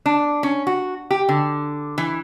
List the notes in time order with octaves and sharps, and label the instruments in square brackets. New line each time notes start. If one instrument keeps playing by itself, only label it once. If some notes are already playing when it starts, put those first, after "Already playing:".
[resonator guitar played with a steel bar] D4
C#4
F#4
G4
D3
E3